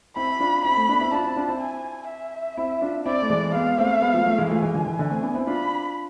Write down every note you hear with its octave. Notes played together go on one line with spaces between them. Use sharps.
C4 E4 B5
D4 F4
C4 E4 B5
A3 C4
B3 D4
C4 E4
D4 F4 A5
C4 E4
D4 F4
C4 E4
G#5
E5
C4 E4
D4 F4
C4 E4 D5
A3
E3 G#3
G#3 B3 F5
A3 C4
G#3 B3
F3 A3
F3 A3
E3 G#3
F3 A3 G#5
E3 G#3
D3 F3
E3
D3
A3 C4
B3 D4
C4 E4
D4 F4 B5